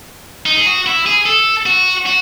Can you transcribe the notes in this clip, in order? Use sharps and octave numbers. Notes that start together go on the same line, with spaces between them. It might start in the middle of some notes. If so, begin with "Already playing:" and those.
D#4
G#4
F#4
E4
G#4
A4
F#4
F#4